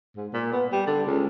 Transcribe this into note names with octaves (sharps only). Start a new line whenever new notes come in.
G#2
A#2
B3
G3
D3
C#2